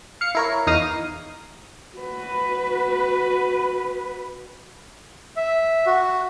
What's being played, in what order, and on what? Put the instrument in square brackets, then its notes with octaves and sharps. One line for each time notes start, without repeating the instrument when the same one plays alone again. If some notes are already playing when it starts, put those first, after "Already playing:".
[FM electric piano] F5 C#7
E4 A#4 C#5
E2 D#4 A#4 F5 D#6 A#6
[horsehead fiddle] F#4 B4
[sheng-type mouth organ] E5
F#4